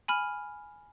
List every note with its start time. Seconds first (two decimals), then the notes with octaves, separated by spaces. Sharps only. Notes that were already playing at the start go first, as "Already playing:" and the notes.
0.08 G#5 B5 F6